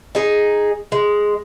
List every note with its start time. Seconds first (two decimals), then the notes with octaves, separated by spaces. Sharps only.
0.15 D#4 G#4
0.92 G#3